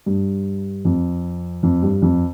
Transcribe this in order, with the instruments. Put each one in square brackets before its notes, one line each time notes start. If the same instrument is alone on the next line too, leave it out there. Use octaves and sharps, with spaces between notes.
[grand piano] G2
F2
F2
G2
F2